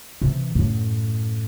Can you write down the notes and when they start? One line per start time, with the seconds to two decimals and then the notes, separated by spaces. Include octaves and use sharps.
0.22 C3 E3
0.55 F#2 A2